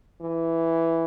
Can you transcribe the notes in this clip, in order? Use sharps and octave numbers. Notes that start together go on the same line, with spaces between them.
E3